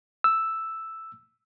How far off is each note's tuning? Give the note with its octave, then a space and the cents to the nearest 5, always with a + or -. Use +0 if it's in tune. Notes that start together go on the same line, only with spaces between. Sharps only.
E6 +0